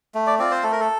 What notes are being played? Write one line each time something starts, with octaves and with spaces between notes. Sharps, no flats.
A3
D5
C4 F4 D5
C5
A3 A4
A#4
A4